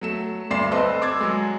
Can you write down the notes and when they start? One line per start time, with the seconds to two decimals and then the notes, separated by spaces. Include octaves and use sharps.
0.01 F#3 A3 E7
0.50 D2 G2 D5 C6 C7 E7
0.71 C4 A4 B4 D#5 A5 C6
1.02 D6 E6 G#6 A6
1.20 F#3 G#3